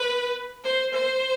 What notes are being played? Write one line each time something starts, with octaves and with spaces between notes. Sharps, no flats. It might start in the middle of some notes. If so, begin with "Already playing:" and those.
Already playing: B4
C5
C5